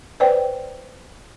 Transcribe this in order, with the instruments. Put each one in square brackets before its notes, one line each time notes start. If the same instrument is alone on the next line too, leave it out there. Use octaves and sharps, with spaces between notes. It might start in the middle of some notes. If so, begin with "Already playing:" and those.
[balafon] B4 C5 D5 G5